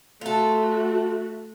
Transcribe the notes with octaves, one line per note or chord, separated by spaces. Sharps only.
A3 F4 F#4 A4